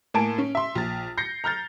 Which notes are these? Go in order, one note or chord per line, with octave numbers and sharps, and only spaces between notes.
A2 A#3 G#5 A5 D7
C#4
E5 C6
A#1 A6
G6 A#6 C7 C#7
A#5 F6 G6 A6